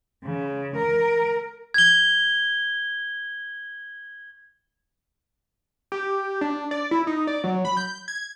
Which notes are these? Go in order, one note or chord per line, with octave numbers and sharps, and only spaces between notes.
C#3
A#4
G#6 G7
G4
D4
D5
E4
D#4
D5
F#3
B5
G6
G#6